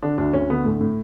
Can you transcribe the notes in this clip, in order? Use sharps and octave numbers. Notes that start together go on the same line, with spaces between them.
D3 D4
D2 D4
D2 C#4
D3 B3
A2 A3
A2